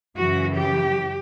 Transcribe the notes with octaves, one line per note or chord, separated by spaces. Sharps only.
F#2 C#3 E3 F#4
G4